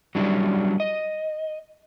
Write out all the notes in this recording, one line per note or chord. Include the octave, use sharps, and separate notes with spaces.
F#3 G3 C#4 D4 E4 G4
D#5